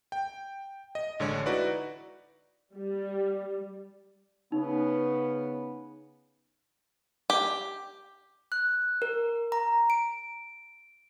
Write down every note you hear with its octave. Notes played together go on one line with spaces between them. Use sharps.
G5
D#5
A1 D3 G#3 C#5
D#4 E4 F#4 B4 D5
G3
C#3 B3 D#4
G4
F#6
A#4
A#5
D7